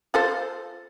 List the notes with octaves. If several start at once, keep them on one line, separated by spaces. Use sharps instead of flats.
F4 A4 C5